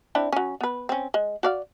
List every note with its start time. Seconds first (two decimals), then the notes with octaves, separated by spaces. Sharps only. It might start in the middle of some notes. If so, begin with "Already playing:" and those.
0.15 C4 D4 E4
0.32 F#3 C#4
0.61 B3 B4
0.89 C4 C#4
1.14 G#3
1.43 F#4 D5 F5